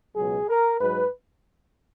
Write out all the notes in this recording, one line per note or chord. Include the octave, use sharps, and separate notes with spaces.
C#2 B2 F#3 G#4
A#4
G#2 F#3 B4